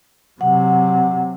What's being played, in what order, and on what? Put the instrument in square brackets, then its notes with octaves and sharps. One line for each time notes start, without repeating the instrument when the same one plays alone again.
[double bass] C3 F#3 [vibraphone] F#5